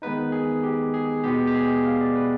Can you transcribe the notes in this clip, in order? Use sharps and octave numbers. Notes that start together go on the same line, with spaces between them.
D#3 G#3 B3 D#4 B4
G#4
G4
G#4
B2 G#3 B3 G4
G4
G#4
F5
D5
B4